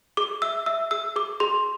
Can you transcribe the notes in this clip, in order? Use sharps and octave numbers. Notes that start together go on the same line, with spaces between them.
G#4 D6
E5 E6
E5 E6
G#4 E6
G#4 D6
G#4 C6